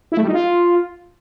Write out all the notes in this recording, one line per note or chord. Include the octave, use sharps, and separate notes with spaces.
E4
A3
G3
D#4
F4